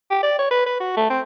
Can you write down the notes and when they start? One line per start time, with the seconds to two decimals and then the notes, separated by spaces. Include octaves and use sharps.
0.11 G4
0.23 D5
0.39 C#5
0.51 B4
0.66 B4
0.80 F#4
0.97 A3
1.10 C4